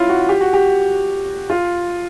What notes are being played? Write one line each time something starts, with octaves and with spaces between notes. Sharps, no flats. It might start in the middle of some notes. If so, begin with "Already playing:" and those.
Already playing: C#4 E4 F4
F#4
G4
F#4
G4
F4